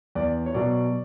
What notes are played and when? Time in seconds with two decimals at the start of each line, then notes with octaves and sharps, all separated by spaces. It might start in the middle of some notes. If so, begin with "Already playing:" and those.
0.15 E2 D5
0.46 C#5
0.54 B2 F#3 D5